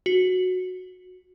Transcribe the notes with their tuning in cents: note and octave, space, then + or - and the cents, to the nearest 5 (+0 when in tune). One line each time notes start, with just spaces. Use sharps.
F#4 -10